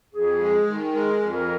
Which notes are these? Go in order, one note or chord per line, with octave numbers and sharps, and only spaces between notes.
F2 G#4
G#3
D#3
G#3 A#4
F2
A#4